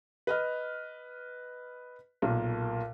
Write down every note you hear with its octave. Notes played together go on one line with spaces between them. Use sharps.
B4 D#5 F6
B1 A#2 A#3